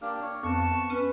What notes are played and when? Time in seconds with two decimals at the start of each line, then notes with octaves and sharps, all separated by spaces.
0.02 A#3 D4 G4 F6
0.22 C#5
0.43 F2 B3 C4 A5 C#6
0.90 C#4 B4